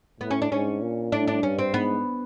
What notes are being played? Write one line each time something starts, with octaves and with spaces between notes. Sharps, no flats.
A2 B3
C#4
D4
G#2 C#4
A#2
A2 D4
D4
G2 C#4
C4
G#2 B3